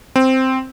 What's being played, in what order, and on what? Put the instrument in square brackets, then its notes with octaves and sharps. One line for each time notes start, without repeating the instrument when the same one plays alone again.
[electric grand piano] C4